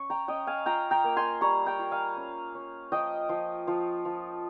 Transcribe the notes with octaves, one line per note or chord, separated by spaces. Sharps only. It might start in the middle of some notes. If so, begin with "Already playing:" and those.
Already playing: C#4 C#6
G5 A#5
C#4 D#5 G5
F5 G#5
F4 G5 A#5
G5 A#5
A#3
G#5 C6
G3 A#5 C#6
G5 A#5
F4
F5 G#5
C#4
C#4
F3 D#5 G5
F3
F3
F3